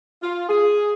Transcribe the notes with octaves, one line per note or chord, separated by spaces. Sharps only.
F4
G#4